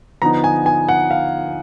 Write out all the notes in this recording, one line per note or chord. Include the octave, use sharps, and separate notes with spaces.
D3 F3 B3 D#4 A#5
G#5
G#5
F#5
F5